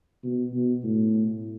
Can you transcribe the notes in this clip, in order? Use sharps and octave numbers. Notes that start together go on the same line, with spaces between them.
B2
B2
A2